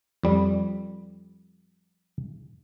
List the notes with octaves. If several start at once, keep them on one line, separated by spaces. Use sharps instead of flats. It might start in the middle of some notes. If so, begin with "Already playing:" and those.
F2 G3